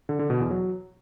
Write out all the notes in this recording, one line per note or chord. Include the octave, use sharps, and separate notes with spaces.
D3
D3
B2
E2
F#3